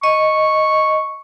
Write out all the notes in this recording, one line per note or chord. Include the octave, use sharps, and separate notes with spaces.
D#5 C#6